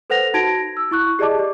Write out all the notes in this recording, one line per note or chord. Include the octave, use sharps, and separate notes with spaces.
A4 B4 C5 F#5 A#6 F7
D#4 F#4 A5 G#6 A#6 D7
E6
E4 C#6 F#6
G4 G#4 D5 D#5 A5 D6
D5